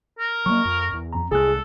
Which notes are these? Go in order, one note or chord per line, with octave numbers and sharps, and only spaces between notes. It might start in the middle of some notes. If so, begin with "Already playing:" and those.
A#4
F#3 A#3 C#6
F2
E2
F2 A#5
C2 G#3 G#4 A4 F#6